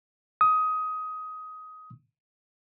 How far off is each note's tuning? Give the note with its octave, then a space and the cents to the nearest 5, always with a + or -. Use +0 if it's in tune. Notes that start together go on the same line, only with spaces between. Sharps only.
D#6 +15